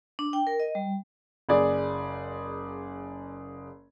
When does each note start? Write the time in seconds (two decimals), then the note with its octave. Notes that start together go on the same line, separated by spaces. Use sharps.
0.19 D4
0.33 G5
0.47 A#4
0.60 D#5
0.75 G3
1.49 F#1 G#4 D5